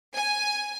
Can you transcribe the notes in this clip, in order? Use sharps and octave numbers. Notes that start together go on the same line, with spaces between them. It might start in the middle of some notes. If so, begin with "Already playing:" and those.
G#5